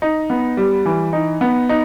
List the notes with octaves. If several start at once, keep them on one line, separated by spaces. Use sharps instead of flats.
D#4
B3
G3
E3
D#4
B3
D#4